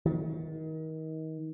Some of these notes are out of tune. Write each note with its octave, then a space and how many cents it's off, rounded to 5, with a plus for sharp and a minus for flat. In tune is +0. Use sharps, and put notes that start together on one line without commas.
D#3 +30